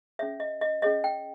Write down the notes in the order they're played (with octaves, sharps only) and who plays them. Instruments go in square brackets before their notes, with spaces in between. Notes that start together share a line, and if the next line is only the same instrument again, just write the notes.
[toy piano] C#4 G#4 C#5 E5
D#5
D#5
C#4 G#4 C#5 D#5
G5